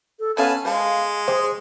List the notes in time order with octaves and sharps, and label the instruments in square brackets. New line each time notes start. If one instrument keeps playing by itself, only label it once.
[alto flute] A4
[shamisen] D3 B3 F5 [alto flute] C#4 [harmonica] B4 G#5 A5
[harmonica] G#3 [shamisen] C5 A5 [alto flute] F5
[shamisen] G4 [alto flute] G#4 [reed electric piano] C5